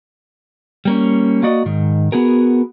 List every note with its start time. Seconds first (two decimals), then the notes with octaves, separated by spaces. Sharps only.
0.85 G3 A#3 C#4
1.43 A#3 F#4 D5 D#5
1.66 G#2 D#3
2.12 B3 F#4 G#4 A#4